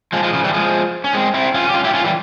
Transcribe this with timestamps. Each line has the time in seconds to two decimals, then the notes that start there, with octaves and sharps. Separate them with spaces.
0.13 F3 G#3
0.23 F3 G#3
0.33 C#3 F3
0.43 E3 G3
0.53 F3 G#3
1.04 C#4
1.13 G#3 C4
1.34 C4 E4
1.54 C#4 F4
1.69 G4
1.74 C#4 F4
1.84 E4 G4
1.93 C#4 F4
2.04 E3 G3